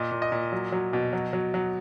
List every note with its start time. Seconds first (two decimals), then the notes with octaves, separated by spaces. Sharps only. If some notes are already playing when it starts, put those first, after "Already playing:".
Already playing: A#2 D#5
0.11 A#2
0.22 D#5
0.32 A#2
0.52 F#3
0.72 F#3
0.93 B2
1.13 F#3
1.33 F#3
1.54 F#3